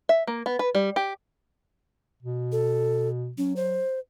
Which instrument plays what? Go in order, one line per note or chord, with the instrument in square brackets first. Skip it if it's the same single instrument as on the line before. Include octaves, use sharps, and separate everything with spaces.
[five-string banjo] E5
A#3
B3
B4
G3
G4
[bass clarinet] B2
[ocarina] A4
[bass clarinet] F#3 [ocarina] C#4
[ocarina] C5